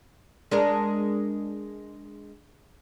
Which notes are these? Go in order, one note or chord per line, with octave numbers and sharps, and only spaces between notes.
G#3 D4 A#4